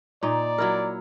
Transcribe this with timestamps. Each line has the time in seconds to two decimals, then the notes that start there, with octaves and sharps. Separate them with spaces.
0.23 A#2 D#4 D5
0.58 F#3 E4 A#4